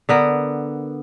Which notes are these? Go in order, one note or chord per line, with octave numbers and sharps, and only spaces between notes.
D3 B3 A#4